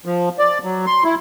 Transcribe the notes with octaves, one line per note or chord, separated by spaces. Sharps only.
F3
D5
F#3
C6
E4